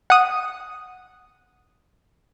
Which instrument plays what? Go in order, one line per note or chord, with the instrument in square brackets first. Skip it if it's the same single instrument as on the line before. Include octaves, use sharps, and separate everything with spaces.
[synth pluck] F#5 D#6